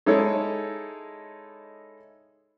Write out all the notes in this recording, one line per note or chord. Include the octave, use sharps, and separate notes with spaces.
G#3 D#4 E4 A4 C#5